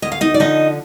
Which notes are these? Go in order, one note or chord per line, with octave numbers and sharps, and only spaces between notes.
D2 D#5
F5
D#4 D#5
D5
D3 F3 D#4 D#5